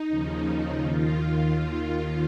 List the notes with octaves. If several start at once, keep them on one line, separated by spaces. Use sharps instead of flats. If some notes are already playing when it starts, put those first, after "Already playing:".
Already playing: D#4
D#2 C#3 F3
D#2 D#3 F4